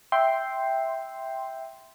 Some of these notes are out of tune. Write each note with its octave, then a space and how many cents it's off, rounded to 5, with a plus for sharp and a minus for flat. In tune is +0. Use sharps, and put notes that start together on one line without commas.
E5 -5 G5 +0 C6 +0